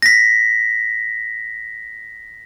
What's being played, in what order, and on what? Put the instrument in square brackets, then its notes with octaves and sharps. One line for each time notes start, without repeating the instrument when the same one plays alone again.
[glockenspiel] A#6 B6